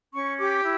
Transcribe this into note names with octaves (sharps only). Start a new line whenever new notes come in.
C#4 C#6
G4 D6
E4